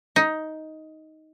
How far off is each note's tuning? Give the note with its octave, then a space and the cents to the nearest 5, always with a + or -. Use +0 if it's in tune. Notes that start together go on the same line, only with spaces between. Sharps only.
D#4 +10